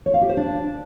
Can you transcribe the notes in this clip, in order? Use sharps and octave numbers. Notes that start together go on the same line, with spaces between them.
C#5
F5
G4
C5
D4